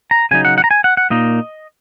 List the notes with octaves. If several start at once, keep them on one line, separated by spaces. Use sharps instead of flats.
A#5
C#3 F#3 D#4 G#5
F#5
F#5
A#5
G#5
F#5
F#5
A#2 A#3 D#4 D#5